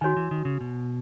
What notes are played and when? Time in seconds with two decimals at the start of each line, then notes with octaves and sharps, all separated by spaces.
0.01 D#3 F#4 C#5 G#5
0.17 E3
0.31 D#3
0.45 C#3
0.61 B2